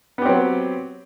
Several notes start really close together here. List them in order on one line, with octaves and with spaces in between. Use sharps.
B3 G4 C4 F#3